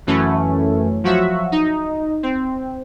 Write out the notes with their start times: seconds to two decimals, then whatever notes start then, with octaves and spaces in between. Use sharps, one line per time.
0.07 F#2 E3 A3 C#4
1.04 F3 F#3 F#4 E5
1.52 D#4
2.23 C4